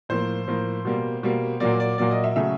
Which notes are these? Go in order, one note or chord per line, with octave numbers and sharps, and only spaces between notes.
A2 F3 A#3 C5
A2 F3 A#3
B2 G3 A#3
B2 G3 A#3
A#2 F#3 A#3 D5
D5
A#2 F#3 A#3 D5
D#5
E5
C#3 F#3 A3 E5